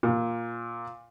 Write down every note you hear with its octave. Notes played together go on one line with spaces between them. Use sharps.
A#2